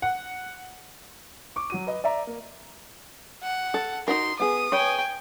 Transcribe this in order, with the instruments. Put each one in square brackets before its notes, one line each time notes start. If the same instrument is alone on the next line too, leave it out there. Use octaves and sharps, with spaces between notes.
[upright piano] F#5
[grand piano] C#6 D6
F#3 F#4 D#7
B4 D#5
D5 E5 A#5
A#3
[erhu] F#5
[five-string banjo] A4
[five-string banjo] D#4 F#4 A#4 [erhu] C6
[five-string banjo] B3 G#4 [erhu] D#6
[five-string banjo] B4 C#5 [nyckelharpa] G5 G#5